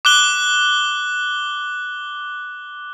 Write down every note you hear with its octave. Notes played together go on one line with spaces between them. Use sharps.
D6 F#6 G7